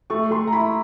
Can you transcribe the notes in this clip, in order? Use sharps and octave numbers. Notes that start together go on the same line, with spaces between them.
A3 C#6
A3 C6
A#5
E4 B5